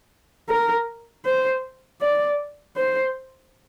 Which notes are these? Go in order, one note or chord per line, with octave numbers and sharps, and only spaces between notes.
A#4
C5
D5
C5